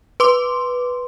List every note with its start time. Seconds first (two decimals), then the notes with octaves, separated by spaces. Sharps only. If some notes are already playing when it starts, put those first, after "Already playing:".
0.20 B4 C6 D6